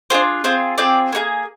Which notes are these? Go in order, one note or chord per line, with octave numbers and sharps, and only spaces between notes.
D4 F4 G#4 C5
C4 F4 G#4 C5
C4 F4 G#4 D5
A#3 D#4 G#4